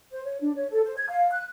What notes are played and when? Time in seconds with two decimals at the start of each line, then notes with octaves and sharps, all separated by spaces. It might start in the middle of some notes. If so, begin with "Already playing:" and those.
0.11 C5
0.24 C#5
0.41 D4
0.55 C#5
0.71 A4
0.85 C5
0.97 G#6
1.09 F5
1.31 F#6